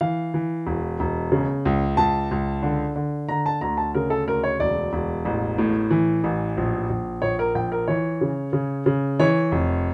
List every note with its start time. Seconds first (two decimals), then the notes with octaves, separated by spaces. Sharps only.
0.01 E3 F5
0.34 E3
0.67 E1
1.00 E1
1.32 C#3
1.65 C#2
1.97 C#2 A5
2.31 C#2
2.63 D3
2.96 D3
3.29 D3 A#5
3.46 A5
3.61 D2 A#5
3.77 A5
3.95 C#3 A#4
4.10 A4
4.27 D2 A#4
4.44 C#5
4.60 E1 D5
4.93 E1
5.25 A1
5.58 A2
5.91 E3
6.24 A1
6.57 A#1
6.90 A#1
7.22 A#1 C#5
7.39 A#4
7.55 A#1 G5
7.72 A#4
7.88 E3 C#5
8.21 C#3
8.53 C#3
8.86 C#3
9.19 E3 C#5
9.52 F1